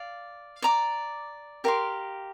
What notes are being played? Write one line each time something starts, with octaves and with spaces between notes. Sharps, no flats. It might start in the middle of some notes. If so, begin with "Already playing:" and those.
Already playing: D5 F5
D5 A#5 D6
G4 A#4 F5 C6